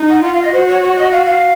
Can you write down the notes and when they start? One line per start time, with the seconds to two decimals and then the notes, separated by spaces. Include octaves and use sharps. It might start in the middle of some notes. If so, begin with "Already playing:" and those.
Already playing: D#4
0.08 F#5
0.22 F4 F#5
0.33 F5
0.42 D#5
0.52 F#4 C5
0.67 C#5
0.82 C#5
0.96 D#5
1.11 F5
1.25 F5